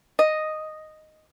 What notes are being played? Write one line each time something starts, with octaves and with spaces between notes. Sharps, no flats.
D#5